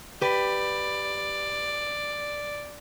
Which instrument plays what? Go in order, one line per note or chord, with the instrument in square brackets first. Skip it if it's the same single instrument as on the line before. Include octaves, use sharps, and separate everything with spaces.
[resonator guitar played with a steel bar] G4 B4 [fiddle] D5